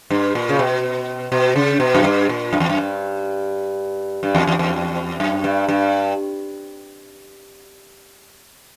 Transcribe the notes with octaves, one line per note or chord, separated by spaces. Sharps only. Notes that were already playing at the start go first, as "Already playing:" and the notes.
G2
A#2
C#3
B2
B2
C#3
B2
F#2
G2
A#2
F#2
E2
F#2
G2
G2
E2
E2
E2
F#2
G2
G2